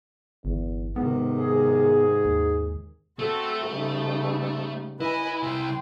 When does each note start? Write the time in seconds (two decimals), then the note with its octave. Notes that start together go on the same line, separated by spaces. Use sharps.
0.45 G1 E2
0.96 G#2 C3 D#3 B3
1.38 G#4
2.25 D#2
3.19 A3 C4 F#4 A4
3.69 G#2 C#3 G3
5.00 E4 B4 D#5 G#5
5.43 C2 E4 G5 C6